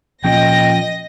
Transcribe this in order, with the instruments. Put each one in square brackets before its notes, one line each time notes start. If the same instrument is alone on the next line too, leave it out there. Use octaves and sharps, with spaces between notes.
[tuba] A#2 [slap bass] F3 C#4 [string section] D#5 A#6 [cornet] G5